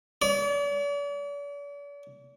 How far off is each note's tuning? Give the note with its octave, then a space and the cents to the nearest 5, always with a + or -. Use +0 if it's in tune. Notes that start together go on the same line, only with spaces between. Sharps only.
D5 -45